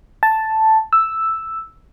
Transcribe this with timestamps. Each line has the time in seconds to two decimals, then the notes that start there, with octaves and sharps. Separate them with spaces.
0.23 A5
0.93 E6